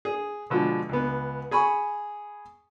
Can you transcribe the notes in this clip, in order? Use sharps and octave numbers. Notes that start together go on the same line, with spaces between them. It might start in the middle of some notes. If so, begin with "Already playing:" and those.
G#4
B2 D3 F3 G#3
C#2 B3
G#4 G#5 B5 C#6